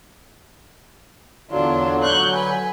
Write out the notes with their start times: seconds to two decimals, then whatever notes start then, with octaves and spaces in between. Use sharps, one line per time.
1.51 E2 D3 F#3 D4 F4
2.03 C#6 F#6 G6
2.34 B4 G#5